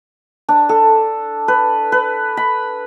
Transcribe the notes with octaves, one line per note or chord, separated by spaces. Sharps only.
D4
A4
B4
B4
B5